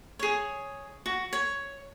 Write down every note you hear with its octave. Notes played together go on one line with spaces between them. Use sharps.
G#4 C#5
F#4
C#5